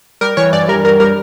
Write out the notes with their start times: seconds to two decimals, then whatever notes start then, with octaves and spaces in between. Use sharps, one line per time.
0.21 G3 A#4
0.37 E3 C#5
0.53 G2 D5
0.68 G3 A#4
0.84 G2 A#4
1.00 G3 A#4